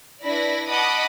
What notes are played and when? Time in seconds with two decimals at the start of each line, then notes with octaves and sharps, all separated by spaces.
0.23 D4 E4 B4 D5 B5 A#6
0.68 D#5 F#5 A5 B5 D6 D#6